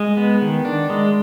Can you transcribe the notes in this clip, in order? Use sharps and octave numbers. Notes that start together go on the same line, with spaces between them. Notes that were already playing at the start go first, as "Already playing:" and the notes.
Already playing: G#3
B3
D#3
D4
G#3